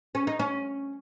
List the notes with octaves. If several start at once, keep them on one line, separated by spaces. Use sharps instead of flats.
C#4
D#4
C#4